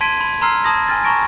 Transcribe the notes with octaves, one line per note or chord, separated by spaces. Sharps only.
A5 C6 G#6 B6 D7 D#7
B5
A#5 C6 E6 F6 C7
A5 B5 D#6 G#6 A#6
G#5 F6 A6
A5 A#5 C#6 A#6 D7